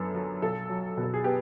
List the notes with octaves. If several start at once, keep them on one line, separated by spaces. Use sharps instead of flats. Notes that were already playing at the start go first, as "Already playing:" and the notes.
Already playing: F#2 D3 B3 A4
F#3
B1 A4
F#3
B2
A4
G#4
B3 G4